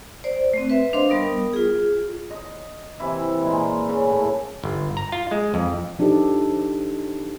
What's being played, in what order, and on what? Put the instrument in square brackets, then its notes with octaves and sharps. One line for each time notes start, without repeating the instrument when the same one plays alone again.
[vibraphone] C5 D5
A3 C4
B4 E5
D4 C5 D#5 F5 C6
G3 B3 A#4 D#6
F4 G#4
[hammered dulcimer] D#5
C3 E3 E4
A#2 G#3
C#3
A2
[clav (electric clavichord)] G1
A#5
F4
G#3
F2
[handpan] F3 D4 D#4 G4 A4